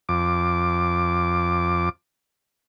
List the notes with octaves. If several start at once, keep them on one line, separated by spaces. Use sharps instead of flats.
F2 D6